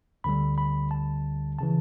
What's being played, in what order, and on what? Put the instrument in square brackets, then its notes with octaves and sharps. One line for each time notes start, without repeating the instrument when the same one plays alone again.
[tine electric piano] D2 D3 G3 B5
B5
A5
C#3 E3 A5